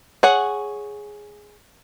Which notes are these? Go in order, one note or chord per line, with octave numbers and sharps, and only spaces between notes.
G#4 C#5 F#5